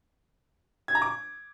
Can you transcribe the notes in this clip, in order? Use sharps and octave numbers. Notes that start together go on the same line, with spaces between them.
G#6
A#5
D6